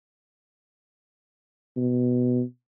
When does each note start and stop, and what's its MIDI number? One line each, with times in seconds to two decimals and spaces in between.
1.77 2.42 47